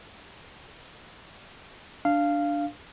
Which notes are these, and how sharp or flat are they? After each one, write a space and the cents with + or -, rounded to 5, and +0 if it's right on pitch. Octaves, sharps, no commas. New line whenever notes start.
D4 +0 F5 -10